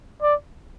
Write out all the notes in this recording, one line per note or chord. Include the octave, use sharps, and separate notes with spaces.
D5